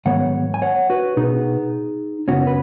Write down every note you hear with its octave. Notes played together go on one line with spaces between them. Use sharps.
G#2 D#3 F#3 B3 C#5 F#5
G#5
C#5 F#5
F#4 B4
B2 B3 D#4 G#4
F#2 C#3 B3 C#4 F#4
B4